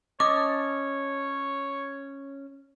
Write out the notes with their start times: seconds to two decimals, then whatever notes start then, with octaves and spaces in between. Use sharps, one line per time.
0.20 C#4 C#5 D#5 A5 D6 D#6